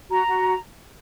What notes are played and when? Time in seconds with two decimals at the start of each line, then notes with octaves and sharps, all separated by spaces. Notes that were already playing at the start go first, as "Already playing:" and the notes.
0.10 F#4 A#5
0.27 F#4